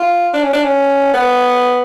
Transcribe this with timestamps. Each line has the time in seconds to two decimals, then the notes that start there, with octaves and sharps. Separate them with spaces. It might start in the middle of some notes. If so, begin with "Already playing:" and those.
Already playing: F4
0.33 D4
0.43 C#4
0.53 D4
0.64 C#4
1.14 B3